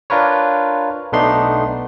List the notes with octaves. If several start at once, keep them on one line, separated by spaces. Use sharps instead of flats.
D4 F4 A#4 B4 C#5
B1 A3 B3 D4 D#4 C6